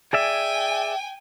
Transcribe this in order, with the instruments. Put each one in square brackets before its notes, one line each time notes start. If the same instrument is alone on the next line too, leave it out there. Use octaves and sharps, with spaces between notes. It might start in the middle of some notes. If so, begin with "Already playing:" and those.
[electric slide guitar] G#4 D5 E5 [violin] G5 G#5